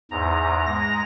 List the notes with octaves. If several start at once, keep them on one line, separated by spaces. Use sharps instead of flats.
E2 G#2 A#5
G#3 A#5 A#6